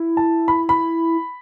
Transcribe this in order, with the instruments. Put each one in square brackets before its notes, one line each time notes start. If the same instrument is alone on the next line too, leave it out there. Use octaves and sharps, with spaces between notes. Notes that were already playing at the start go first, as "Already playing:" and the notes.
Already playing: [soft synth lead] E4
[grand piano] A5
B5
B5